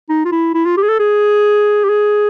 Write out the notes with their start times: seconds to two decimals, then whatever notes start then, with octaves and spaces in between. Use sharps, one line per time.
0.09 D#4
0.25 F4
0.32 E4
0.54 E4
0.65 F4
0.77 G4
0.83 G#4
0.88 A4
0.99 G#4
1.84 G4
1.89 G#4